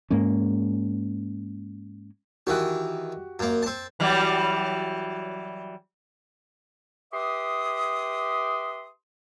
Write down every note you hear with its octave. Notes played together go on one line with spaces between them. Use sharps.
G#2 G#3 A#3 C#4
D#3 E3 F#4 G4 F#6
F#2 A#3
C4 A5
E3 F#3 G3
G4 B4 E5 C6 D6 D#6